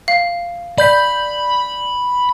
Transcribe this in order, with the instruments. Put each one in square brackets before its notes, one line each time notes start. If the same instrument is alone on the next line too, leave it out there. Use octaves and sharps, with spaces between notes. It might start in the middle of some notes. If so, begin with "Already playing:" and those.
[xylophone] F5
[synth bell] D5 G6 B6 [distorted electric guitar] B5